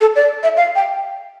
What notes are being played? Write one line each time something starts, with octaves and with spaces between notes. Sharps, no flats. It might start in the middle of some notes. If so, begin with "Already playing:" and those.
A4
D5
E5
F5
G5